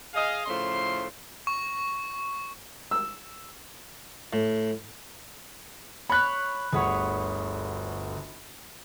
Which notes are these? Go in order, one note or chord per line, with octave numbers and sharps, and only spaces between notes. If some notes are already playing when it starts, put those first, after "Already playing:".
G#4 D#5 F5
A2 C#3 F3 A3 C6
C#6
E6
A2
C#5 B5 F#6
G1 D2 G#4 B4 C#5 F#5